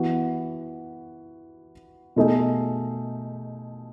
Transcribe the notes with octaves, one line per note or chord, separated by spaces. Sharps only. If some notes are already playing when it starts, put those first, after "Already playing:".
Already playing: E3 B3 F#4
B2 A3 D#4 G#4